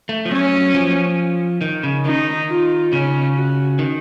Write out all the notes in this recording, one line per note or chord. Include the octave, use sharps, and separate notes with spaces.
A3
F3
F#3 C#4
F3
D#3
C#3
D#3 D#4
F4
C#3 C#4
F#4
D#3